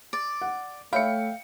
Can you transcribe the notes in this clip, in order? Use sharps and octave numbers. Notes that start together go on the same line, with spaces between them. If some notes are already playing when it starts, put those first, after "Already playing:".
D5
F#5
A3 C#5 E5 F5 G5 B5 C#7